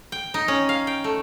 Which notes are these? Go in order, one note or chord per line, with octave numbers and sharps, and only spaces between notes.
G5
D#4
C#4
F5
G5
A3